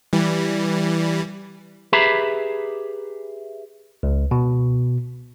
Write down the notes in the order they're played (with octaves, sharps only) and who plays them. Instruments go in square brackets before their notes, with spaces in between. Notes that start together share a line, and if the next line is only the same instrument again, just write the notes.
[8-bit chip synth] E3 G3
[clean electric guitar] G4 G#4 B4 E5 A#5 B5
[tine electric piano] C#2
B2